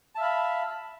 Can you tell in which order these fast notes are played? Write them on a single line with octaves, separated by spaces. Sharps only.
A5 E5 F5 B5